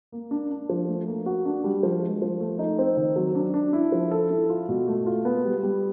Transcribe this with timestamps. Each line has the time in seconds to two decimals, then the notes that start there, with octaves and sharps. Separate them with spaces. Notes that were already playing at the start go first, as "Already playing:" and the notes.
0.12 A#3
0.31 D4
0.50 D4
0.69 F3
0.88 A3
1.07 A#3
1.26 F#4
1.45 D4
1.64 G3
1.83 F3
2.02 G#3
2.22 F3
2.40 A3
2.59 D#4
2.79 C4
2.97 D#3
3.16 F#3
3.35 D4
3.54 D4
3.73 E4
3.92 F3
4.11 A4
4.30 E4
4.50 F4
4.69 B2
4.87 A3
5.07 F4
5.25 B3
5.45 G3
5.63 G3